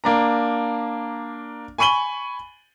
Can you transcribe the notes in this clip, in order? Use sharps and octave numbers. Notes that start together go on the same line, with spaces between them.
A#3 D4 A#5
G#5 B5 C#6 D#7 F#7 G7